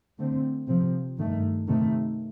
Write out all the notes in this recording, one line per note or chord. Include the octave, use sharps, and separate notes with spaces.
D3 A3 C4
C3 F3 C4
G2 D#3 A3
C3 D#3 A3